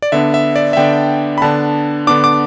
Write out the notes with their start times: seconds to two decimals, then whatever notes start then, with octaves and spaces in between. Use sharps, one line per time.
0.02 D5
0.12 D3 B3 D4 E5
0.34 E5
0.56 D5
0.73 E5
0.77 D3 B3 D4 G5
1.38 B5
1.42 D3 B3 D4 A5
2.07 D3 B3 D4 D6
2.24 D6